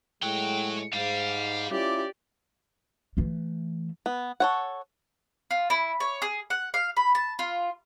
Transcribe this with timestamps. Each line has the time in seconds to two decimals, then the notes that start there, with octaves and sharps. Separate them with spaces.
0.23 A2 G#3 C#5 F#5 G5
0.93 G#2 G3 F5
1.70 C#4 E4 F4 G4 D5
3.17 E3 A3
4.06 B3
4.40 A4 C#5 F#5
5.51 F4
5.70 E4
6.00 C#5
6.22 G#4
6.50 F#5
6.74 F5
6.97 B5
7.15 A5
7.39 F4